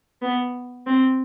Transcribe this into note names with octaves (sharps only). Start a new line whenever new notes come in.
B3
C4